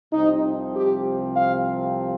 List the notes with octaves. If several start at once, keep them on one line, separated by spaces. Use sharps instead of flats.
C2 C3 F3 C4 D#4
G4
F5